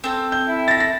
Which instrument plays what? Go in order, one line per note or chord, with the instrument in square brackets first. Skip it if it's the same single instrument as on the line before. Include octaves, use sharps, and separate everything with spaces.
[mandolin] C4 A4
[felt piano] G6
[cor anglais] E4
[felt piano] A6 A#6
A#6